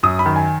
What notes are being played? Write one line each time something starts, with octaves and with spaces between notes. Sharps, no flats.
F#2 D#6
B5
D#3
G#5